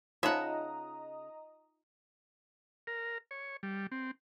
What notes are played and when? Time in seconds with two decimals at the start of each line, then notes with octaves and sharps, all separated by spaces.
0.23 C#3 D#4 F4 D#5 E5 F#5 A#5 D#6
2.87 A#4
3.31 C#5
3.63 G3
3.92 C4